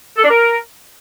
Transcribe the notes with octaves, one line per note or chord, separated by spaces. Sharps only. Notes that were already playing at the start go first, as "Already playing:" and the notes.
A4
D4
A#4